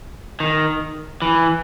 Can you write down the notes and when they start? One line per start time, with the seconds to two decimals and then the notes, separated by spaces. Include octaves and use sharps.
0.40 D#3
1.22 E3